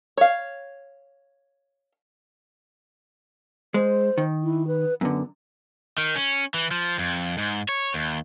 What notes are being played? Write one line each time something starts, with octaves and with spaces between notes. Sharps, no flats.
C#5 F5
G#3 C5
D#3
E4
B4
F#2 D3 B3
D#3
C#4
E3
F3
F2
G#2
C#5
D#2